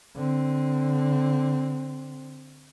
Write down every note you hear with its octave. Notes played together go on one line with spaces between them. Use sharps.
D3 C4